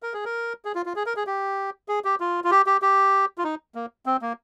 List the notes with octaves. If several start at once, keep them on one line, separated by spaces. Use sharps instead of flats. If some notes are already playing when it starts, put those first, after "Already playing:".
A#4
G#4
A#4
G#4
F4
F4
G#4
A#4
G#4
G4
G#4
G4
F4
F4
G4
G4
G4
F4
D#4
A#3
C4
A#3